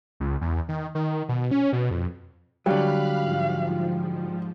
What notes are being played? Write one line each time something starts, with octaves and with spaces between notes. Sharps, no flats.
C#2
E2
D#3
D#3
B2
C#4
B2
F2
D3 F#3 G3 F5 B5 F6 F#6
G#2 F3